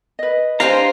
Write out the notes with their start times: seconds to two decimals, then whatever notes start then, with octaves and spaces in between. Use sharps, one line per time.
0.19 B4 D#5
0.60 D4 G4 C5 F5 G#5 A#5